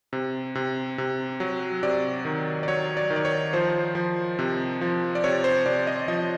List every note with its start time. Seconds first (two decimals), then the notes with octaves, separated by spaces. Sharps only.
0.13 C3
0.55 C3
0.98 C3
1.40 F#3
1.83 C3 D5
2.25 D#3
2.63 D5
2.68 F#3 C#5
2.97 D5
3.10 D#3
3.16 D5
3.25 C#5
3.53 F3 C5
3.95 F3
4.39 C3
4.81 F3
5.15 D5
5.24 C3 C#5
5.44 C5
5.66 C3 D5
5.87 D#5
6.08 F3 D#5